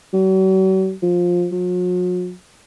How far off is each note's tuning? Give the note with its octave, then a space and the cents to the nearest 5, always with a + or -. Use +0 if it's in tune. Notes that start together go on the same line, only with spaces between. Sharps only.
F#3 +45
F3 +15
F#3 -45